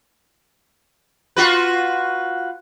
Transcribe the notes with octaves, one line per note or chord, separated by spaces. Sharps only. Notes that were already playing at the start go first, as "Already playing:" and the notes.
F4 F#4 B4